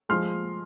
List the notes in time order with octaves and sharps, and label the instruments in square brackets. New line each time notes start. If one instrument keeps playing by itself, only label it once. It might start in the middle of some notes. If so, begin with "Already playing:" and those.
[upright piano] F3 G#3 C6 F6